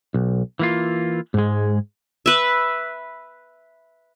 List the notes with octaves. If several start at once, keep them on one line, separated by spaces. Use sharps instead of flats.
B1
E3 A#3 F4
G#2 G#3
B4 E5